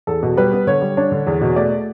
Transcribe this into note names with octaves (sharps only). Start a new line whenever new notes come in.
E2 A4
B2
G3 B4
B3
D3 C#5
G3
D4 C#5
D3
E2
B2
A3 D5